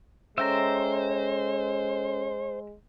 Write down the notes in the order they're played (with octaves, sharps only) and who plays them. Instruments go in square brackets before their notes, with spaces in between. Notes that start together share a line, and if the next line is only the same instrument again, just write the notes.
[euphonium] G#3 [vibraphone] C#4 A4 C#5 [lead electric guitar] C5 [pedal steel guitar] E5 G5 A#5